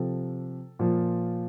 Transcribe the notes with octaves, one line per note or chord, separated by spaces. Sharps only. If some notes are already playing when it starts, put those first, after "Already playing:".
Already playing: C3 F3 A4
A#2 F3